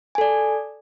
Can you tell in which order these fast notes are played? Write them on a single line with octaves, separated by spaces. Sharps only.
G#5 A4 D5